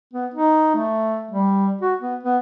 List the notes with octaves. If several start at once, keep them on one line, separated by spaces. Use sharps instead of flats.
B3
D#4
A3
G3
F#4
B3
B3